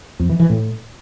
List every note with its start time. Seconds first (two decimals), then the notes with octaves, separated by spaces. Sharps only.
0.19 F2
0.29 E3
0.40 E3
0.50 A2